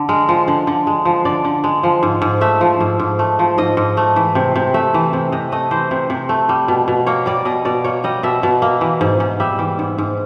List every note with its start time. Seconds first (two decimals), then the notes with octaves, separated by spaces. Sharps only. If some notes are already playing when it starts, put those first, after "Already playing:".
Already playing: D3
0.09 G#3 A#4
0.29 F3
0.48 D3
0.67 D3
0.87 G#3
1.05 F3
1.25 D3 D5
1.45 D3
1.64 G#3
1.83 F3
2.03 G#2
2.22 G#2
2.41 A3 E5
2.61 F3
2.81 G#2
3.00 G#2
3.19 A3
3.39 F3
3.58 G#2 D#5
3.77 G#2
3.97 A3
4.16 E3
4.35 C3
4.56 C3
4.74 A3 E5
4.94 E3
5.13 C3
5.32 C3 D#5
5.52 A3 D#5
5.71 E3 C5
5.91 C3
6.10 C3
6.29 A3
6.49 G3
6.68 B2
6.88 B2
7.06 A#3 C#5
7.26 G3 D5
7.45 B2 D#5
7.65 B2 D5
7.84 A#3 C#5
8.04 G3 D#5
8.23 B2 E5
8.43 B2
8.62 A#3
8.81 E3
9.01 G#2
9.20 G#2
9.40 G3 E5
9.59 E3
9.79 G#2
9.98 G#2